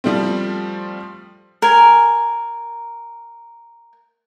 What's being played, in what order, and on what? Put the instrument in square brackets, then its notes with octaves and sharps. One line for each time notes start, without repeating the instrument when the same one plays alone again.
[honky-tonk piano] F3 G3 A3 C4
[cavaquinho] A#4 G#5